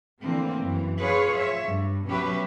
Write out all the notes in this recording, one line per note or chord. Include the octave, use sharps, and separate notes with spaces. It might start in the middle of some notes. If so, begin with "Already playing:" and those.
D3 E3 A3 A#3 C4
F#2 E3
F4 G#4 B4 C#5
C#5 E5
G2
B2 F#3 C#4 G4 B4 E5